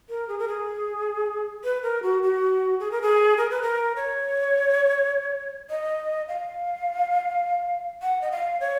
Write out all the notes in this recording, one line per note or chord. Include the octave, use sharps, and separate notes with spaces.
A#4
G#4
A#4
G#4
B4
A#4
F#4
F#4
G#4
A#4
G#4
A#4
B4
A#4
C#5
D#5
F5
F#5
D#5
F5
C#5